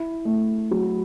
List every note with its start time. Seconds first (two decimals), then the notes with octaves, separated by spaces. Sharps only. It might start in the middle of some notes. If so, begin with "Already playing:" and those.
Already playing: E4
0.25 A3
0.71 F#3